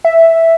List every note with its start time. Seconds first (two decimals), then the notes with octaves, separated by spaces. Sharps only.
0.05 E5